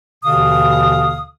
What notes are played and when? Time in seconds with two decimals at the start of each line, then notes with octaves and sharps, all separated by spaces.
0.25 D#2 B2 D3 E3 F5 D#6